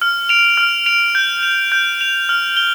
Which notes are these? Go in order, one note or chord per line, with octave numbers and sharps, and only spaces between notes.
F6
D7 F7
F6
D7 F7
G6
F7
G6
F7
F6
G7